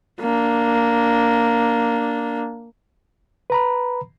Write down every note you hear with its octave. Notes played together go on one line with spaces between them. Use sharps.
A#3 D4
B4 A#5 B5